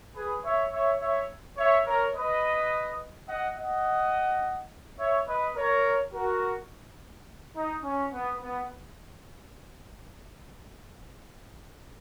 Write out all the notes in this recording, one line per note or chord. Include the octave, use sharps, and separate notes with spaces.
G#4 B4
C#5 E5
C#5 E5
C#5 E5
C#5 E5
A#4 C#5
B4 D#5
D#5 F#5
D#5 F#5
C#5 E5
B4 D#5
A#4 C#5
F#4 A#4
D#4
C#4
B3
B3